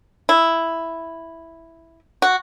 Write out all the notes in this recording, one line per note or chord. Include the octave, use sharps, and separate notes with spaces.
E4
F#4